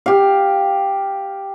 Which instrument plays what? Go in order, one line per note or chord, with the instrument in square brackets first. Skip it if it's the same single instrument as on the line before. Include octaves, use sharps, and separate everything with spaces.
[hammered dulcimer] G4 F5